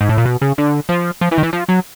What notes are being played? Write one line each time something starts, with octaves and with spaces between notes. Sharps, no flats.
G#2
A2
A#2
B2
C#3
D3
F3
F3
E3
D#3
E3
F3
F#3